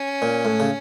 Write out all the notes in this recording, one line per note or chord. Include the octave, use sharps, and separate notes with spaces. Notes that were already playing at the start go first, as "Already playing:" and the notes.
Already playing: C#4
A#2
A2
C#3